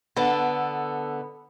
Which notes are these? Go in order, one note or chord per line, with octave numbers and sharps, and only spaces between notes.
D3 B3 A4